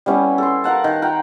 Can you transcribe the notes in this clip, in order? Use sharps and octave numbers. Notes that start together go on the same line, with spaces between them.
G3 B3 C#4 E4
A4 C6
A#4 F5 F#5 A5
D#3
A#4 F#5 G5